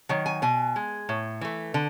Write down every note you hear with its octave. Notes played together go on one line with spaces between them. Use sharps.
D#3 F#3
G#5
B2 G#5
G#3
A2
E3 A3
D3